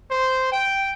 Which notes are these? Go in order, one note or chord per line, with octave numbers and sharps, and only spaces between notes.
C5
G5